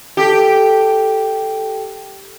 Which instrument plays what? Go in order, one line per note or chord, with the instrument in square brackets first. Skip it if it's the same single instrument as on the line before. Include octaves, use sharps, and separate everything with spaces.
[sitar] G4 [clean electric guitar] A4